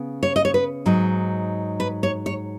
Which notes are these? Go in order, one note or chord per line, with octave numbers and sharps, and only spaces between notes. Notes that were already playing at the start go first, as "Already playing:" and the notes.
Already playing: C#3 B3
C#5
D#5
C#5
B4
G#2 F#3 D#4
B4
C#5
C#5